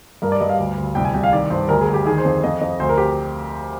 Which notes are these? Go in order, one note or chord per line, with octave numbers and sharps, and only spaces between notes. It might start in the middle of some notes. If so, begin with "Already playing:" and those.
G2 A#4
D5
G2 D#5
F5
D2
D2
C2 G5
G#5
C2 G5
F5
D#3 D5
G2 C5
D2 A#4
G#4
D2
G4
D#3 G#4
C5
F2
F2 D#5
F2 D#5
D2 C5
A#4
G4